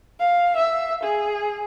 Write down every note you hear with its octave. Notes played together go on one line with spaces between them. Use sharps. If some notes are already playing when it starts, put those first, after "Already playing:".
F5
E5
G#4